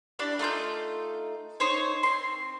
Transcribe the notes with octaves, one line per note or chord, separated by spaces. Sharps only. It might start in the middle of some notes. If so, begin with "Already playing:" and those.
D4 E4 G4 D5
A3 D#4 F4 G6
D#4 C5 C#5
C4 C6